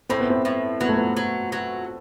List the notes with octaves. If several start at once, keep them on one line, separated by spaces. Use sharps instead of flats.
A2 C4
B3
C4
A2
F#3 B3
A3
B3
F#3
F#3